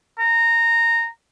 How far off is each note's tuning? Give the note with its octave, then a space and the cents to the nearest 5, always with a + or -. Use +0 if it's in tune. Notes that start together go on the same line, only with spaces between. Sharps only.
A#5 -15